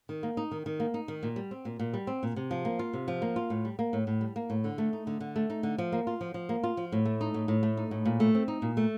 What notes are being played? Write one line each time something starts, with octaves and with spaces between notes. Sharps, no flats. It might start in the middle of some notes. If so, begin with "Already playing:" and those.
D#3
A#3
D#4
D#3
D#3
A#3
D#4
D#3
A#2
G3
C4
A#2
A#2
G3
C4
A#2
C3
F3
A#3
F4
C3
F3
A#3
F4
A2
G3
A#3
A2
A2
G3
A#3
A2
D3
A3
D#4
D3
D3
A3
D#4
D3
F3
A#3
F4
F3
F3
A#3
F4
F3
A2
A3
D#4
A2
A2
A3
D#4
A2
A#2
A3
C4
D#4
A#2
A3